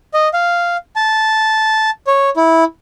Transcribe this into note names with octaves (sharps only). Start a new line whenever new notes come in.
D#5
F5
A5
C#5
E4